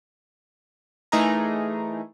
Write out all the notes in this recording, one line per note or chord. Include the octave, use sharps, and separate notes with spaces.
E3 A3 D#4 G#4 A#4 A#5